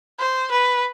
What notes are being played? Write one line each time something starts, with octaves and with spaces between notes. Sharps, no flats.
C5
B4